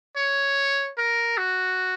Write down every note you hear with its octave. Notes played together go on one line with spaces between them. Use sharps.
C#5
A#4
F#4